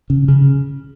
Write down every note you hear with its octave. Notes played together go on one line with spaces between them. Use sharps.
C#3
C#3